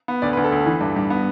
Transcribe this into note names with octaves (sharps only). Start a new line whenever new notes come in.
B3
D2 D5
B4
D2
A4
D2
E3
G2
G2
B3